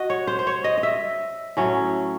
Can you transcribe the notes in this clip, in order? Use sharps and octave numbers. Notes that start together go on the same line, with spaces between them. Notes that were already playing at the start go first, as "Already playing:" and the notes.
Already playing: F#4 D#5
C#5
C5
C5
C#5
D#5
D#5
E5
A2 F#3 A3 C#4